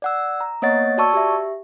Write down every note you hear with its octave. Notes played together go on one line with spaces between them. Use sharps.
D5 F#5 E6
A#5
A#3 B3 C#5 D#5 F#5 A6
F#4 D5 A5 C#6 E6
G4 E5